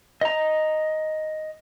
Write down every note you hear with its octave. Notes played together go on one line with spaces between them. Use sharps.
D#5 A#5